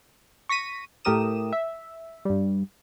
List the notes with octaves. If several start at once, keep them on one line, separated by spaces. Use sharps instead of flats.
C#6 A#6 B6 D#7
A2 A3 G4 A#4 D#6 E7
E5
G2 G3